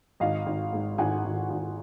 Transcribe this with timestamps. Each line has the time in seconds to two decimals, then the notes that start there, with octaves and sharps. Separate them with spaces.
0.20 G#1 D#5 F5
0.46 G#1
0.73 G#2
0.98 G#1 F#5 G#5
1.24 G#1
1.50 G#1